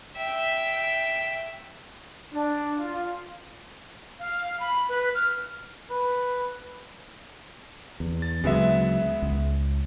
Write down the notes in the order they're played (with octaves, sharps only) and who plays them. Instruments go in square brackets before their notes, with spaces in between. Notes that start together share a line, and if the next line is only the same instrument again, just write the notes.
[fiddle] E5 G5
[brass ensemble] D4
F4
[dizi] F5
B5
B4
F6
[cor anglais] B4
[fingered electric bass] E2
[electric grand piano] A6
[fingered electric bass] D2 C#3 F#3 [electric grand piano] G#3 B3 E5
[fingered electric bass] C#2